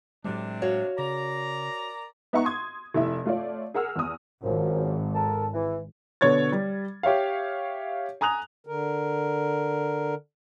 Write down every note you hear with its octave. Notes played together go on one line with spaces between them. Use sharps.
A2 C3 F#3 G#3 D4
F#4 C#5 F5
C#3 A#4 D5 A#5
B3 D#4 E5 F#5 A#5 C#6
C6 D#6 G#6
F1 E4 E5
A3 F4 C#5 D5
G#4 A#4 F#5 E6 F6
E2 D#6
G#1 F#2 F3
A4 A#4 A5
E3
B2 D3 C#5 G#6 A6
G3
G4 C#5 E5 F5
G#5 A#5 D#6 F#6 F7
D3 A#4